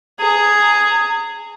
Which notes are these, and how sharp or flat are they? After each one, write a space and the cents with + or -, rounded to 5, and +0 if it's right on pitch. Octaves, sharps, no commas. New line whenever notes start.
G#4 +0 A#5 -30